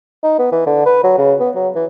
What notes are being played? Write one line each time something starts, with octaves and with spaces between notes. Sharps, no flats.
D#4
B3
E3
D3
B4
F#3
C#3
B3
F#3
E3